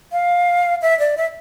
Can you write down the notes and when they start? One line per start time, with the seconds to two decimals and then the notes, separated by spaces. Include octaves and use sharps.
0.12 F5
0.82 E5
0.99 D5
1.17 E5